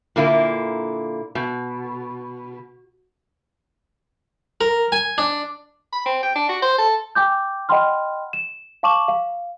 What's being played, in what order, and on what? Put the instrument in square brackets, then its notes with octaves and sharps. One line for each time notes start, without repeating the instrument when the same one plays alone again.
[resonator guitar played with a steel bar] A#2 D3 A#3 E4
B2
[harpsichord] A#4
G#5
D4
[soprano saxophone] B5
C4
G5
D4
F#4
C5
A4
[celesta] G5 G#5 D6 G6
D#5 F#5 G5 B5 C6 F6
E7
F5 A5 C#6 D6 E7 F#7
F5